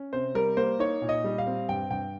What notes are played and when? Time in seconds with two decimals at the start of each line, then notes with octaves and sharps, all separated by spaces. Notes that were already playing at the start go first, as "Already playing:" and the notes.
Already playing: C#4
0.13 C3 C5
0.35 G3 A#4
0.57 A#3 C5
0.79 D#4 C#5
1.02 A#2
1.09 D#5
1.24 G3
1.38 F5
1.46 C4
1.69 G2 G5
1.91 G2 G5